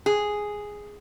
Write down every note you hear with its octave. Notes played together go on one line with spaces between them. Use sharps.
G#4